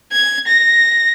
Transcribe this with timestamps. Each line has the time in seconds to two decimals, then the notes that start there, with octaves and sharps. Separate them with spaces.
0.12 G#6
0.47 A#6